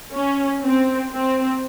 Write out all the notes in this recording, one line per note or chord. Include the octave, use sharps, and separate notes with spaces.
C#4
C4
C4